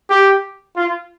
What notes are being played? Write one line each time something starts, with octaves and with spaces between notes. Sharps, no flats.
G4
F4